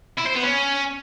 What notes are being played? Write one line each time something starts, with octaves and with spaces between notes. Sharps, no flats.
E4
C5
B3
C#4